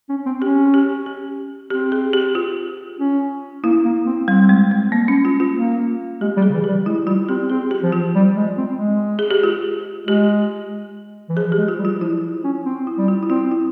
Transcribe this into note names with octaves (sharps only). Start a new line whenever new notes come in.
C#4
C4
C#4 G4
G4
G4
C4 G4
G#4
G4
F4
C#4
A#3 E4
A#3
C4
G3 C4
G#3
G#3
A#3
C#4
F4
F4
A#3
G#3 G4
G3
G#4
C#3
E3
G3 G4
G#3 E4
G3 F4
C4 G4
C4 G#4
G4
F3
F4
G3
G#3
C4
G#3
G#4
G4
F4
G#3 G4
E3
F3 G#4
G4
G#3
F4
G3
F4
F3 E4
C#4
C4
E4
G3
F4
E4
C4 F4
E4